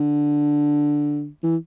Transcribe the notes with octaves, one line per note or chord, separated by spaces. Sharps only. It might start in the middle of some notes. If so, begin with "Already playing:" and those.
Already playing: D3
E3